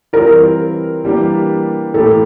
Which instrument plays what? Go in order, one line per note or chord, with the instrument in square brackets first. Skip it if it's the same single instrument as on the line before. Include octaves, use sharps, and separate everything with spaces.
[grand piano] E3 G3 C4 F4 [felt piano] A#4
[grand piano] E3 G3 A#3 D4 G4
[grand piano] A2 E3 A#3 E4 G4 [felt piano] A4